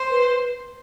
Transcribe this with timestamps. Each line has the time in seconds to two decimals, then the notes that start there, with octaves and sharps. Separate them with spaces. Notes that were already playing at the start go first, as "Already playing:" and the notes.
Already playing: C5
0.11 B4